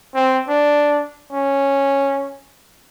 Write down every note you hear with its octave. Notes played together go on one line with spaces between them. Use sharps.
C4
D4
C#4